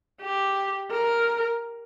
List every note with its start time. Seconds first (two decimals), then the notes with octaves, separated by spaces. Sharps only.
0.21 G4
0.91 A#4